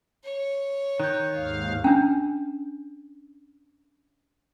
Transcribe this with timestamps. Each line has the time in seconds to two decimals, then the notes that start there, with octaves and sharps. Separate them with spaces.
0.23 C#5
1.00 D#3 F#6 G6
1.35 D#2 G#2 F5
1.84 C#4 D4